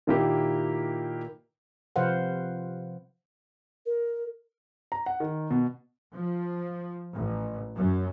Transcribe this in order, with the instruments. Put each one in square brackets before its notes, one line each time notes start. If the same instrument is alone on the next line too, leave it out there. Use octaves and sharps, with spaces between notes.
[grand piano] A#2 D#3 A#3 E4 G4
[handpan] C3 F3 B4 C5 F5 F#5
[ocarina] A#4
[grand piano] A#5
F#5
D#3
B2
[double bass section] F3
A1
F#2